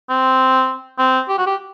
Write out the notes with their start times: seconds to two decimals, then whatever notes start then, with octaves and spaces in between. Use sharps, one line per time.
0.09 C4
0.99 C4
1.29 G4
1.38 F#4
1.46 G4